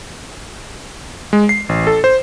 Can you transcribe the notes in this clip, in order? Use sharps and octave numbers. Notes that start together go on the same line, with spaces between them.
G#3
C7
A1
A4
C5